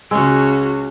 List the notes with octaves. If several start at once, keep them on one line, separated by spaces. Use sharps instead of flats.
C#2 C#3 G#3 C#4 F#4 E6